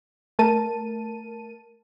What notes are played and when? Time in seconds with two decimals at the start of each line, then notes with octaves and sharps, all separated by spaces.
0.39 A3 A#4 A5 D#7